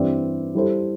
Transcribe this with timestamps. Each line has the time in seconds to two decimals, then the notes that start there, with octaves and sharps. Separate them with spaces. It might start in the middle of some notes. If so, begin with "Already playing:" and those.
Already playing: G2 E3 C4 G4 D5
0.55 G3 E4 A4 C5